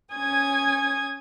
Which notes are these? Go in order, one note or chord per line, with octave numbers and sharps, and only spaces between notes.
C#4 G#5 D#6 G#6